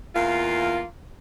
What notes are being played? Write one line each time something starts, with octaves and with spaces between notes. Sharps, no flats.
E2 A#3 F4